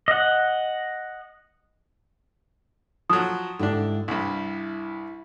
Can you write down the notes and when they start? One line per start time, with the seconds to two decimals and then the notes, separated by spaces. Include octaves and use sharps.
0.08 D#5 F#5
3.10 F3 F#3 D#6
3.59 G#2 D3 D4 E4 G4
4.08 C2 G2 E4